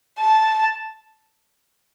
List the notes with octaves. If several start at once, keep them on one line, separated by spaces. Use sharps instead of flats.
A5